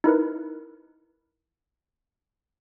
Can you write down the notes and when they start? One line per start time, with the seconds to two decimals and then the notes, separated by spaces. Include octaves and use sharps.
0.04 D#4 E4 A#4 B4